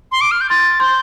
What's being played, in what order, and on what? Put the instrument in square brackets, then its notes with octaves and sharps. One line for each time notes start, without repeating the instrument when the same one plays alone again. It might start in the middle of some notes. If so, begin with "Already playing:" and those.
[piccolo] C6
D6
F6
G6
[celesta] C6 [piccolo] A6
[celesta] C6 [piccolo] G6